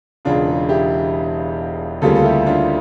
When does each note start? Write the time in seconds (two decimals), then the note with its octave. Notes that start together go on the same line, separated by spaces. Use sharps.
0.25 E1 E2 C#3 D4 F4
0.69 E4 G4
2.02 D2 C#3 G3 A#3 F4 A4
2.15 A4
2.24 E4 G4
2.46 D4 F4